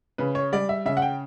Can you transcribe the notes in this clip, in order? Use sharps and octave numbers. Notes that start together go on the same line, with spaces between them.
C#3 B4
C#5
G3 D5
E5
C#3 E5
F#5
G5